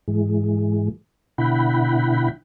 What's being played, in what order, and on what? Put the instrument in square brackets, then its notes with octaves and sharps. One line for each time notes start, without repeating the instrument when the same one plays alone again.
[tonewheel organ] G#2 E3 G#3
B2 D3 E4 F#5 G5 B5